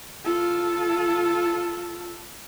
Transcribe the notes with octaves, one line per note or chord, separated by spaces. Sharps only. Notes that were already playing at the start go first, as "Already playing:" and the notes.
F4 A4